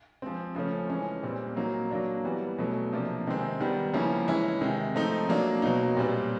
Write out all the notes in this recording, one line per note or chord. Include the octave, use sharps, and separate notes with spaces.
F3 G#3 C4
C#3 F3 A3 C#4
E3 G#3 C#4
A#2 G3 C4
F#3 A#3 D#4
F#3 A#3 D4
E3 G3 B3
B2 F#3 A3
C3 F3 A#3 D4
C3 D#3 G#3 C4
D#3 G3 B3
C#3 F3 A#3 C#4 E4
E3 G#3 C#4 E4
C3 D#3 G#3
F3 A3 C4 D#4
F#3 A#3 D4
B2 F#3 A#3 D#4
A#2 G3 C4